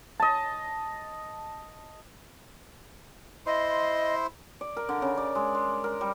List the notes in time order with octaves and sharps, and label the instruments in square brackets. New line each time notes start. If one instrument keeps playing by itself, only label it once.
[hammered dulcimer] D#5 A5
[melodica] E4 C5 C6 [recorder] D#5
[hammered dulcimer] D5
A#4
D3
C#3
D5
G#3
G#3
A#4
G3